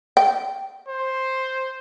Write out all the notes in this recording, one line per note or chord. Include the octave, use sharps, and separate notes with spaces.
G5
C5